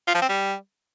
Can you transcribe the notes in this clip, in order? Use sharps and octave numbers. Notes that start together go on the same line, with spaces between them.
F4
F3
C4
G3